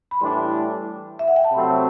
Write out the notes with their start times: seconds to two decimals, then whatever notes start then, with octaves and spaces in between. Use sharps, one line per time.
0.11 B5
0.21 A2 E3 G3 D4 C6
1.19 E5
1.28 F#5
1.36 G5
1.44 A5
1.52 C3 F#3 A3 C4 B5